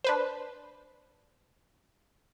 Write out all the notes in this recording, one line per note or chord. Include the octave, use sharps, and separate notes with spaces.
D4 B4 C5